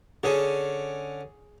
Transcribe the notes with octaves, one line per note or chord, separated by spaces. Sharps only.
D3 C#4 G#4